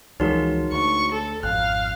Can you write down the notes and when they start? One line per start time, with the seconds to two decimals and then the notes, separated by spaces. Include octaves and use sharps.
0.20 C#2 E3 F3 G#3 C#4 D#4 F#4 A#4
0.72 D2 C#6
1.12 A4
1.43 G#1 F2 F5 F#6